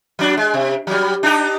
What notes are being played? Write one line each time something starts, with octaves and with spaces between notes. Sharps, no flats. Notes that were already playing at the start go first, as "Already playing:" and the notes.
F#3 D4
G#3
C3
F#3 G3
D4 D#4 G4